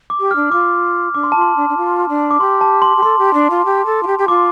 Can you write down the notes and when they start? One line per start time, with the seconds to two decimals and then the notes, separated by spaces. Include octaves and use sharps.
0.10 D6
0.20 G4
0.31 D4 F6
0.51 F4 D6
1.14 D4 D6
1.24 C6
1.32 F4 A5
1.41 C6
1.56 D4
1.69 D4
1.77 F4
2.09 D4
2.31 D6
2.40 G4 C6
2.61 A5
2.82 C6
2.97 G4
3.02 A4 C6
3.19 G4
3.34 D4
3.50 F4
3.65 G4
3.86 A4
4.03 F4
4.07 G4
4.19 G4
4.28 F4 D6